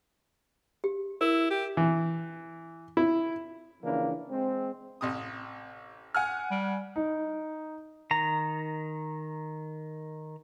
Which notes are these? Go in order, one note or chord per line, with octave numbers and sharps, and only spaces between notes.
G4
E4 A#4
G4
E3
E4
C#3 E3 F3 A#3 D4
G#3 C4
A1 C3 D#6
F#5 G#5 F6
G3
D#4
D#3 A#5